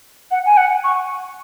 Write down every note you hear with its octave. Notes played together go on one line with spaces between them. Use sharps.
F#5
G#5
F#5
C#6